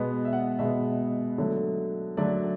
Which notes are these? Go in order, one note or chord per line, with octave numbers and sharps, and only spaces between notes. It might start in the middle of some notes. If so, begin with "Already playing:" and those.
Already playing: B2 G#3 B3
E5
F#5
B2 G#3 B3 E5
D3 F#3 A3 C#5
D3 F#3 A3 D5